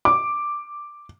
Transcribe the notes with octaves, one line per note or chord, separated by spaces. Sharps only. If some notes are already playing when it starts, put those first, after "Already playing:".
D6